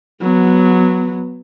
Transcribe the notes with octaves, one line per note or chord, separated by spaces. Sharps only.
F#3 B3